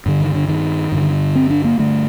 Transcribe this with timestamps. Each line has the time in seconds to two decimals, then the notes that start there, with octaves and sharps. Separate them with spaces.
0.06 G2 D3
0.20 D#3
0.34 D3
0.49 D#3
0.92 G2 D3
1.35 C4
1.50 D4
1.65 A#3
1.79 G2 D3 A3